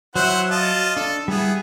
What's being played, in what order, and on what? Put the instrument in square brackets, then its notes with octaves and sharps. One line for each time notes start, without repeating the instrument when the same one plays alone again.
[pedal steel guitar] F#3 C#5 E5 [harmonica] E4 C5 F#5
[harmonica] F4 D#5 A5
[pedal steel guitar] D4 [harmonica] A4
[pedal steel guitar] G3 E4 [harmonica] B3 G#4